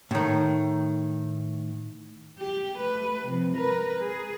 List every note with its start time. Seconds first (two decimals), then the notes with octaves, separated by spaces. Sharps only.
0.11 A2 D#3
2.38 G4
2.77 A3 B4
3.26 C3 F3
3.56 A#4 B4
4.00 G#4